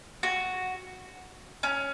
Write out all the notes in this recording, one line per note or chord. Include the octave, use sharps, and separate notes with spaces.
F#4
C#4